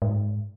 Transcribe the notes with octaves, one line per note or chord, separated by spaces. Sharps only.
G#2